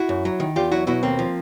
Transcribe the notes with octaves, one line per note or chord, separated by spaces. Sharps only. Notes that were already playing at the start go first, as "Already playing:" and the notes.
Already playing: E4 F#4
F#2
F#3
D#3
E2 F4 G4
F#3 E4 F#4
B2 E4 F#4
D#2 A#3 C4
F3